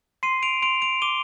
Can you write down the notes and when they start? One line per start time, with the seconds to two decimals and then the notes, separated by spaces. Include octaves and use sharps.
0.23 C6 C7 D#7
0.43 D7 F7
0.62 C6 D7 F7
0.82 D7 F7
1.02 D6 D#7 G7